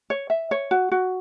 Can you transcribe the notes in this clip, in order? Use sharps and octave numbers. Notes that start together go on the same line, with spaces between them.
C#5
E5
C#5
F#4
F#4